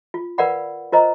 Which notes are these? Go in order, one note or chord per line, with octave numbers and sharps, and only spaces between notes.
F4
A#4 B4 D5 F5 F#5 B5
F4 A#4 C5 D#5 A#5